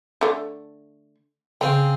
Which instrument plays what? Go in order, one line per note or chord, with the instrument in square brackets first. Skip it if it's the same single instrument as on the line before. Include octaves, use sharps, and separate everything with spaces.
[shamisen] D3 A3
[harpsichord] C#3 C4 [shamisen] G5